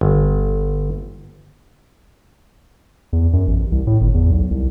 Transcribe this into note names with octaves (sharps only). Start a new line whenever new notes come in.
G1
E2
F#2
A1
C2
A2
G1
E2
B1
C2